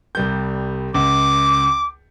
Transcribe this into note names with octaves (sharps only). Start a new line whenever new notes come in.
C2 G3 G6
C#2 D6